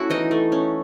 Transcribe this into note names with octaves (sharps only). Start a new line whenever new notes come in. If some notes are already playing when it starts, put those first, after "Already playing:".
Already playing: A3 C#4 E4 F#4 F#5
E3 D#4 D#5
A3
C#4